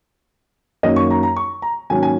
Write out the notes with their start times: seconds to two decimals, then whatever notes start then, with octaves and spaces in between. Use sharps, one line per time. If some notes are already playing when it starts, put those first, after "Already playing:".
0.83 F#2 D#3 A#3 C#4 D#5
0.96 C#6
1.10 A#5
1.23 A#5
1.36 C#6
1.62 A#5
1.90 G#2 D#3 F#3 A#3 C#4 G#5
2.03 G#5